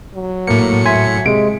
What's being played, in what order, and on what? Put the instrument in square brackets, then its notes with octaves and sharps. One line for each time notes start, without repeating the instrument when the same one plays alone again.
[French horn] F#3
[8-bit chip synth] A2 C#7 [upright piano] A#3
[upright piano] E5 C6 [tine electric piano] G#5 G#6 B6
[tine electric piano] C3 G#3 [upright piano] D7